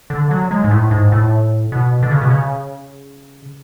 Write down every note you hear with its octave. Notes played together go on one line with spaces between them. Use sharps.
D3
F#3
G#3
G#2
A2
G#2
A2
B2
D3
C#3
B2
C#3